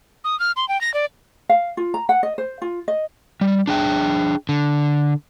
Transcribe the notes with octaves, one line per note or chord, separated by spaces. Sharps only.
D#6
F6
C6
G5
A#6
D5
F5
F4
A#5
F#5
D#5
C5
F4
D#5
G3
D4 G#4 G5
D3